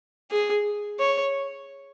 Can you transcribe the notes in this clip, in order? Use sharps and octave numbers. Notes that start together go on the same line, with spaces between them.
G#4
C#5